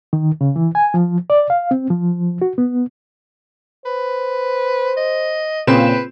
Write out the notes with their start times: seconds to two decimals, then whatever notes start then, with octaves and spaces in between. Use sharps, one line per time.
0.13 D#3
0.41 C#3
0.56 E3
0.75 G#5
0.94 F3
1.30 D5
1.50 F5
1.71 C4
1.90 F3
2.42 F#4
2.58 B3
3.85 B4 C5
4.97 D#5
5.67 A#2 C#3 C4 B4 E7